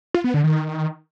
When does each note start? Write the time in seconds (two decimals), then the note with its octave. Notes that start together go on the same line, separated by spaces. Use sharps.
0.14 F4
0.24 B3
0.34 D3
0.44 D#3